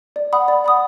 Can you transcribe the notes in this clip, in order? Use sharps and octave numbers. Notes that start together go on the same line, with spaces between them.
D5
F#5 B5 D#6
D5
F#5 B5 D#6